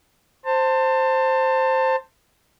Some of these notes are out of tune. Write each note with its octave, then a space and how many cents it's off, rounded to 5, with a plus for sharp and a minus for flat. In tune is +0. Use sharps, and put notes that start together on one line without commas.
C5 +0 A5 +25